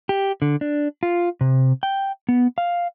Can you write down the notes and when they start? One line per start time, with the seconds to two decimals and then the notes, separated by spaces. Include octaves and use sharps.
0.09 G4
0.42 D3
0.61 D4
1.03 F4
1.41 C3
1.83 G5
2.29 B3
2.58 F5